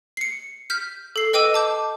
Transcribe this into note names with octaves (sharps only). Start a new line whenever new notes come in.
C7 C#7
F6 G6 B6
A4 C7
B4 D#5 G5 D6 E6 D#7
A5 D6 G6